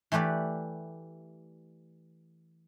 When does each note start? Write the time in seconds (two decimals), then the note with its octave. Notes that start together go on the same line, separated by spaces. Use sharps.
0.12 E3 A3 G4 B4 D5